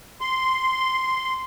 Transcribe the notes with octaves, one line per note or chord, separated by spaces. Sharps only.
C6